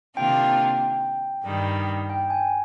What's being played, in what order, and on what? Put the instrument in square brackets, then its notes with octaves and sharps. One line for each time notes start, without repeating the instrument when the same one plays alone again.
[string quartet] C3 D#3 A#3 D4 F4 [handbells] G5
[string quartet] G2 D#3 G3
[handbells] G5
G#5